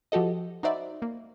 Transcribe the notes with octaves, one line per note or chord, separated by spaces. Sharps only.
F3 F#4 G4 A4 D#5
D#4 F#4 C5 D5 E5 B5
A#3